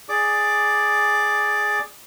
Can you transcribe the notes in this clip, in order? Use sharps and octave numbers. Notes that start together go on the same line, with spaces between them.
G#4 D5 D6